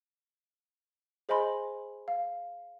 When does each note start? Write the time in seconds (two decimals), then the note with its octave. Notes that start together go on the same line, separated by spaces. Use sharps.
1.29 G#4 C5 D#5 G#5 B5 C6
2.08 F5